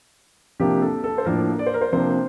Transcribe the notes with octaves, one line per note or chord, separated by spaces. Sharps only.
C3 F3 A#3 D4 G4
A4
A4
C5
A2 F3 A#3 D4 A#4
D5
C5
A#4
C5
C3 F3 A#3 D4 C5